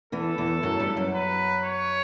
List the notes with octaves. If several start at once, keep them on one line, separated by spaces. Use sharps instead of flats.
E2 E3 A4
E2 E3
F#2 F#3
G2 G3
F#2 F#3
B4
C#5